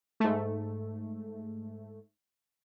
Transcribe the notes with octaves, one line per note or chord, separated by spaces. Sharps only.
G#2 A3